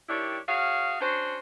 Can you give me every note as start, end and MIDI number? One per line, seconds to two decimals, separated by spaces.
0.09 0.37 51
0.09 0.37 55
0.09 0.37 62
0.09 0.37 64
0.09 0.37 67
0.09 0.37 73
0.48 0.95 66
0.48 0.95 68
0.48 0.95 73
0.48 0.95 77
1.01 1.37 61
1.01 1.37 62
1.01 1.37 66
1.01 1.37 72